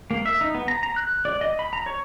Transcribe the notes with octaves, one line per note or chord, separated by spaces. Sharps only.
A#3
E5
D#4
B3
A#5
A#5
F#6
D5
D#5
B5
A#5
C#5